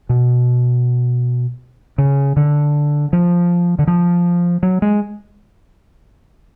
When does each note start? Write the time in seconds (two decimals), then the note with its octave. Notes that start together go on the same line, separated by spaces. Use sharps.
0.09 B2
1.98 C#3
2.37 D3
3.13 F3
3.79 D3
3.87 F3
4.63 F#3
4.82 G#3